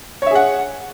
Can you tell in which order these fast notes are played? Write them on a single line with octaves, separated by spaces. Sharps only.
C#5 E5 G#4 F#5